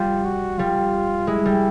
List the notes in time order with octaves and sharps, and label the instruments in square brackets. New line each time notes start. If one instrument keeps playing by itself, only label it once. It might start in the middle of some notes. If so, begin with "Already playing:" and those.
Already playing: [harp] G3 [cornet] F4
[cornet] F#4
[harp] G3 [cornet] F4
[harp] G#3 [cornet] E4
[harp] G3